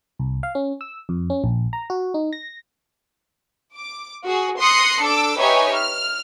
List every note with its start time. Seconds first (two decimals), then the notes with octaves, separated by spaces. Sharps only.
0.19 C2
0.43 F5
0.55 C#4
0.81 E6
1.09 F2
1.30 C#4
1.44 A#1
1.73 A#5
1.90 F#4
2.14 D#4
2.33 A#6
3.75 D6
4.25 F#4 G#4
4.58 C6 D#6 F#6 A#6 C7 C#7
5.02 D4 A4 D6 E6
5.37 D#4 G4 B4 C#5 E5 G#5
5.73 F6